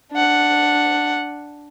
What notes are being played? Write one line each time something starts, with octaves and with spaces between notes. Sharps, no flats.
D4 F#5